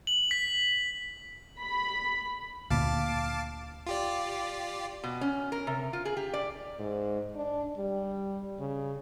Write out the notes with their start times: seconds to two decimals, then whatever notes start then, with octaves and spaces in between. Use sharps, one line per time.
0.07 F#7
0.31 B6
1.59 B5
2.70 D2 A#2 F5 A5 D6
3.87 F4 G4 D5
5.04 B2
5.21 C#4
5.52 A#4
5.67 C3
5.93 F4
6.05 G#4
6.17 G4
6.33 D5
6.79 G#2
7.36 D4
7.78 G3
8.59 C#3